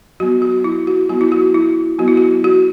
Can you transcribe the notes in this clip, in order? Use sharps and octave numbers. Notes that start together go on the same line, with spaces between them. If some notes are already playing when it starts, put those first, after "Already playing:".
F#3 B3 F#4
F#4
E4
F#4
F#3 B3 F#4
E4
F#4
E4
F#3 B3 F#4
E4
F#4
F#4